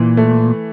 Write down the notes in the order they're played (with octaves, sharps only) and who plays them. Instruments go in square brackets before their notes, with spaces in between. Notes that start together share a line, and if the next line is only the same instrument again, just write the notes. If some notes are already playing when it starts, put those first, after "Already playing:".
Already playing: [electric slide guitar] A#2 [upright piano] E3
[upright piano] A3